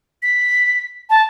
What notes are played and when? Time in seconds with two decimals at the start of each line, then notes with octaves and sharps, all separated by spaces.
0.23 B6
1.10 A5